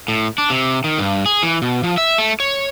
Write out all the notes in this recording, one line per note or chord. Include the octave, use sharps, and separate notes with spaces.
A2
D4
C3
D#3
G2
G#4
E3
B2
F3
E5
A3
C#5